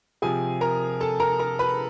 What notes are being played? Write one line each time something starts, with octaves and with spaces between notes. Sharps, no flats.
C3 F3 G#4 G#5
A#4 A#5
A4 A5
A#4 A#5
A#4 A#5
B4 B5